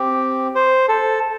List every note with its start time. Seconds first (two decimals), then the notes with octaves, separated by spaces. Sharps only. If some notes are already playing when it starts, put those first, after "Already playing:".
Already playing: C4 G4
0.55 C5
0.88 A4